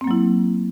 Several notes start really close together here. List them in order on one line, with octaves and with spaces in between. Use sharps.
C4 A#3 F#3 E4